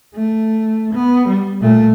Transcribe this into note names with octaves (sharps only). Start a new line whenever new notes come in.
A3
B3
G3
A#2 A3